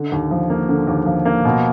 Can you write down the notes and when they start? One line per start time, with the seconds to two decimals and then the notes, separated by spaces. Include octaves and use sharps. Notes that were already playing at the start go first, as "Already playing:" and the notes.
Already playing: D3
0.12 D#2
0.31 F3
0.50 A#3
0.69 D3
0.87 D#2
1.06 F3
1.25 A#3
1.45 B2